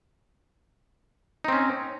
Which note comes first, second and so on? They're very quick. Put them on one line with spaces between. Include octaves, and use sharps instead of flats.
D#4 C4 C#4